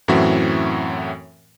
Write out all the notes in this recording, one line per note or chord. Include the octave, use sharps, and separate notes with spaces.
F#2 A2 E3 C4 F#4 E5